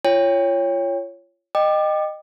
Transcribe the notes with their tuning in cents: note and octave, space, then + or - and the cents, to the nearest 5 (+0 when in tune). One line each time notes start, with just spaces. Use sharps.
F4 -25 C#5 +0 G5 +30
D#5 -20 G5 +0 D6 +30